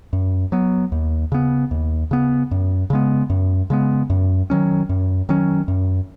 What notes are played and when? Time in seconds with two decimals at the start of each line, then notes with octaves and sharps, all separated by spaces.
0.13 F#2
0.52 F#3 B3
0.92 D#2
1.32 C#3 B3
1.71 D#2
2.11 C#3 B3
2.51 F#2
2.90 C#3 G#3 B3
3.30 F#2
3.70 C#3 G#3 B3
4.10 F#2
4.50 D#3 F#3 C#4
4.89 F#2
5.29 D#3 F#3 C#4
5.68 F#2